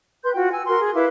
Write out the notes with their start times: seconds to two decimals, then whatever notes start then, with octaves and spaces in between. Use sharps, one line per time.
0.23 B4 C6 G6
0.35 F4 F#4 G5
0.52 G#5 E6
0.67 F#4 A#4 C6
0.80 G#4
0.94 E4 B4 F5 D6